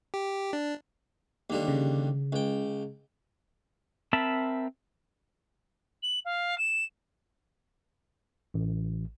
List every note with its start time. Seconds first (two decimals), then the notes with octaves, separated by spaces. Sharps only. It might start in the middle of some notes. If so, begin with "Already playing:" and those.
0.14 G4
0.53 D4
1.50 D#2 D3 G3
1.68 C#3
2.32 C#2 G5
4.13 C4 A#4 E5 A5 B5
6.02 F#7
6.25 F5
6.58 E7
8.54 A1